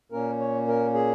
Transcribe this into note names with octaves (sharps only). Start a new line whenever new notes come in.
A#2 A#3 C#4 A#4
C#5
A#4
G#4